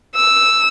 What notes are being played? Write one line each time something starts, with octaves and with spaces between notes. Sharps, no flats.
E6